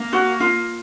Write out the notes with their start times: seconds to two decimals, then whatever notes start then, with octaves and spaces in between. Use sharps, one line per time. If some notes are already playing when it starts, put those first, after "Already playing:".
Already playing: A#3
0.13 F#4
0.40 F4